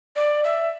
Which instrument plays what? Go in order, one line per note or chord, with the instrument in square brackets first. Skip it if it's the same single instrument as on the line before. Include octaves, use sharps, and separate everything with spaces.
[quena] D5
E5